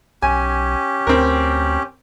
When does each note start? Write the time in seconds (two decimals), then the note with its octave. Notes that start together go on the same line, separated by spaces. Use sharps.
0.22 B1 C#4 G4 G#5
1.07 D2 C4 A#4